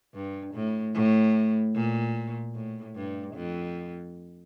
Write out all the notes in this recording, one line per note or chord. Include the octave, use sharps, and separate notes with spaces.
G2
A2
A2
A#2
A2
G2
F2